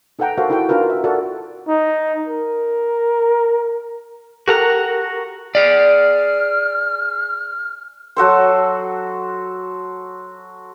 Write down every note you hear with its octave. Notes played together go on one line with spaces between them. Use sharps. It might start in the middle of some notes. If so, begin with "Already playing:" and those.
D#4 A4 B4 F#5 G5 A#5
F#4 A4 A#4 C5 F5 F#5
D#4 E4 F#4 A4 G5
D4 F4 F#4 A#4 B4
E5
F#4 A4 A#4 D5 F#5
D#4
A#4
F#4 G4 A4 A#4 F#5 A#5
G#4 D5 F6
F#3 F#4 A4 C5